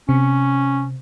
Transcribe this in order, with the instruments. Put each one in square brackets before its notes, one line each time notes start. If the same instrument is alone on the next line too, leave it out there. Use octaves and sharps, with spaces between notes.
[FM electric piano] C3 [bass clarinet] C#4